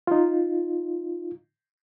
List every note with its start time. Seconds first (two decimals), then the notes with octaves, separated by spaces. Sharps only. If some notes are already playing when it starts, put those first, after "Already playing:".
0.07 D#4 F4